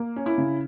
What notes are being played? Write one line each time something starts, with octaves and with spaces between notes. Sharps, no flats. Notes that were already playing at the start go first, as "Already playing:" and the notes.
Already playing: A#3
C#4
E4
C#3